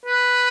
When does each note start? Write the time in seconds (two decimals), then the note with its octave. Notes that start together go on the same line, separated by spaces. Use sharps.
0.06 B4